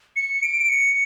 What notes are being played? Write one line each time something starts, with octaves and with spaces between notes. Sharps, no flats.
C#7
D7
D7
C#7